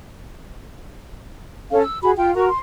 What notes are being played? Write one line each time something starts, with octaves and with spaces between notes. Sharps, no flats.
C#4 A4 F5
E6
F#4 G#4 B5
F4 G5
F#4 A#4 A#5 C#6
C6